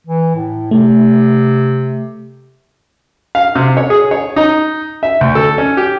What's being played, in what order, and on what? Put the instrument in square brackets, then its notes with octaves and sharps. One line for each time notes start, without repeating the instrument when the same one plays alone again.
[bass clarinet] E3
A2
[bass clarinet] C3 [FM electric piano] A3
[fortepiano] F5
C3
C#5
G#4
C#5
D#4
E5
D2
A4
C#4
G4